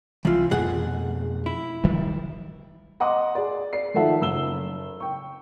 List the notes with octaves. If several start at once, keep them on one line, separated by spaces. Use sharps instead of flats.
C2 C3 E3 F3 F4
F2 B2 A3 G#4 F#5
E4
D#3 F3 G3
D#5 F#5 C6 D6
G#4 D5
D5 C7
D#3 F3 A3 E5 F#5 A5
F#1 E6 G7
G5 C#6